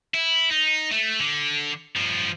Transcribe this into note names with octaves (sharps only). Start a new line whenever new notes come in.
E4
D#4
A3
D3
G2 F3